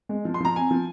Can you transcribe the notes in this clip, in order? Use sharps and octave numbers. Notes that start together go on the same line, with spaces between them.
G#3
F3
C6
F3 A#5
C4 G#5
F3